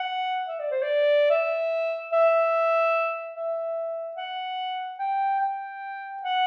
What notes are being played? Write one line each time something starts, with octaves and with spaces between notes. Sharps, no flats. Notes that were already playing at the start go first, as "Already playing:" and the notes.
Already playing: F#5
E5
D5
C5
D5
E5
E5
E5
F#5
G5
G5
F#5